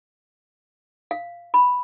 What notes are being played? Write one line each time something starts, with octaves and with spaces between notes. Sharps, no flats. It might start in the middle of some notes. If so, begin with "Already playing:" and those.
F5
B5